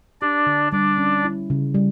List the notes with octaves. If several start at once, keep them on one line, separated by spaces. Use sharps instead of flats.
D4 G4 D5
D3
G3 D4 D5
C#4
E4
C#3
G3